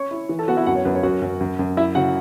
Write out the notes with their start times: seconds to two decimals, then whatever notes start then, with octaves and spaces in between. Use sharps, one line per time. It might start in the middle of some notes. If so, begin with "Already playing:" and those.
Already playing: C#4 C#5 C#6
0.11 E4
0.29 E3
0.39 A4 A5
0.48 B3 F#4 F#5
0.57 E4 E5
0.66 F#2 F#4 F#5
0.76 C#5
0.85 F#2 B4
0.95 C#5
1.03 F#2 F#4 F#5
1.22 F#2
1.41 F#2
1.59 F#2
1.77 E4 E5
1.95 C#3 F#4 F#5